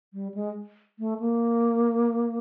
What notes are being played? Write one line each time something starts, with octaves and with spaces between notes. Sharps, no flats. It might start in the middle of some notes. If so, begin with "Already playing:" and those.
G3
G#3
A3
A#3